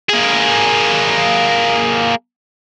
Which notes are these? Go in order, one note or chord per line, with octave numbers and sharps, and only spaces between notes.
A#3 G#4